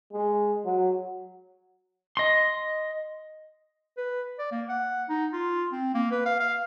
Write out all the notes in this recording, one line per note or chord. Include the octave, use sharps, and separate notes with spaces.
G#3
F#3
D#5 C6
B4
D5
A#3
F#5
D#4
F4
C4
A#3
B4
F5
F5